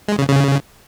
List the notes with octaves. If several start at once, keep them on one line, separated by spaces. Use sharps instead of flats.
G#3
C#3
C#3